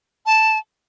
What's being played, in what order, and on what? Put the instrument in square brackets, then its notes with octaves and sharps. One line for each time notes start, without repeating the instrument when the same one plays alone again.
[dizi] A5